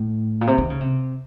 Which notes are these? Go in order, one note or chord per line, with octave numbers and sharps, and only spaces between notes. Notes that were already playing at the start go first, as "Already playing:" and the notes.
Already playing: A2
A#2
C3
D#3
C#3
C3